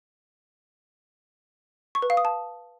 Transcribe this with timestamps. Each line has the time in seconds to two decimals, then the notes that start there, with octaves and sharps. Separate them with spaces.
1.95 C#6
2.02 B4
2.10 F5
2.17 D#6
2.25 A5